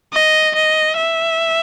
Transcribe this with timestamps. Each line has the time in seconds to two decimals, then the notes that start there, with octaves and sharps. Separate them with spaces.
0.13 D#5
0.55 D#5
0.97 E5